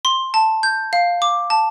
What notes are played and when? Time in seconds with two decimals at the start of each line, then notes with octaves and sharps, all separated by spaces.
0.05 C6
0.34 A5
0.63 G6
0.93 F5
1.22 D6
1.50 A5